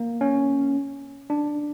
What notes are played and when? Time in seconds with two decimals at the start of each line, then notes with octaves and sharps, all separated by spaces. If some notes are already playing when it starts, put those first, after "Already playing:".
Already playing: A#3
0.21 C#4
1.30 D4